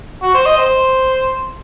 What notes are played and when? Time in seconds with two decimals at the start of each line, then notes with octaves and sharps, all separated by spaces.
0.22 F#4
0.34 C5
0.46 D#5
0.58 C5